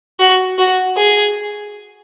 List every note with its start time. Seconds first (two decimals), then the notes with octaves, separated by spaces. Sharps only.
0.20 F#4
0.58 F#4
0.97 G#4